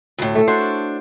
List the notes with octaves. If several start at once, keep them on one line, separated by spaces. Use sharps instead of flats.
D2 A2
A3 A4
D4 F#4 C5 C#5